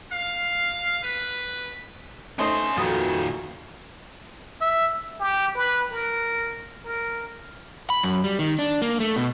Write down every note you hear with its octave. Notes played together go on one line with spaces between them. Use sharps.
F5
B4
A3 C#4 D#4 C5 C6
F2 A#2 D#3 F#4 B4 D#6
E5
G4
B4
A#4
A#4
B5
F#2
G3
D#3
D4
A#3
A3
B2